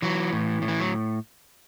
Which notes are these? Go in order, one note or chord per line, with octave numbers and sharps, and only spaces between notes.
E3 F#3
A2
A2
E3
F#3